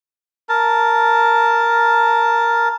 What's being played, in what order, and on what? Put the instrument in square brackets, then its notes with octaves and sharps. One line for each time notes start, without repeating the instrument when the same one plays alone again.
[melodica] A#4 A5